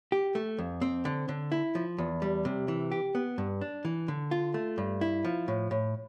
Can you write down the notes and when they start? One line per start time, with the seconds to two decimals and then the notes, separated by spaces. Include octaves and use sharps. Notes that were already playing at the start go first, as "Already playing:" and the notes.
0.12 G4
0.35 A3
0.58 F2
0.82 C4
1.05 D3
1.29 D3
1.52 E4
1.75 F3
1.98 E2
2.22 G3
2.45 C3
2.68 E3
2.92 G4
3.15 B3
3.38 G2
3.61 D4
3.85 E3
4.08 D3
4.31 F4
4.54 A3
4.78 G2
5.01 E4
5.24 F3
5.48 A2
5.71 A2